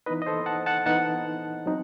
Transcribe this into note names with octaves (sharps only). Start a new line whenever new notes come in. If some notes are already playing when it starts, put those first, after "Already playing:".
E3 B3 D#4 B4 D#5
D#5
A4 C5
F#5 A5
F#5 A5
E3 B3 D#4 F#5 A5
F#3 C4 D#4